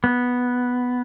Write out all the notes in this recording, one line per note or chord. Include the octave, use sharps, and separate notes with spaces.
B3